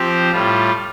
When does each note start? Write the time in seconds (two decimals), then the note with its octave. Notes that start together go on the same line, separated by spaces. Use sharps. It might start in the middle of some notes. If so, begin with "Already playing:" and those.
Already playing: F3 C4 G4 C5
0.31 A2 G3 F4